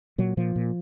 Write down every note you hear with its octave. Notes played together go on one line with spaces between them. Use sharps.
A#2 F#3
A#2 F3
A#2